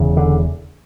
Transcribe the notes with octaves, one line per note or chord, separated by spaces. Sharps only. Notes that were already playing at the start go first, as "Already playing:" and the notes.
Already playing: E1 E2 C#3
D3